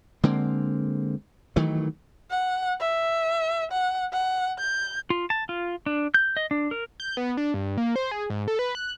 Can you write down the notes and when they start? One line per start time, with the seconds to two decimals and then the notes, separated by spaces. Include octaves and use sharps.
0.24 D3 G#3 A#3 C4
1.56 D#3 E3 F#3 A3
2.30 F#5
2.80 E5
3.71 F#5
4.12 F#5
4.58 G6
5.10 F4
5.30 A5
5.49 F4
5.86 D4
6.14 G6
6.37 D#5
6.51 D4
6.71 A#4
7.00 G6
7.17 B3
7.37 D4
7.54 G2
7.78 A#3
7.96 C5
8.11 G#4
8.30 G#2
8.48 A4
8.59 B4
8.75 F#6